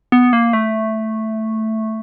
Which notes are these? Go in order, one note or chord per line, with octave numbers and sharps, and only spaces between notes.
B3
A#3
A3